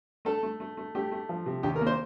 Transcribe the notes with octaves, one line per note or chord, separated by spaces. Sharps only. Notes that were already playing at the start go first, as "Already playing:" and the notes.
A3 A4
A3
A3
A3
A3 G4
A3
F3
C3
D#2 G4
A#4
A#3
C5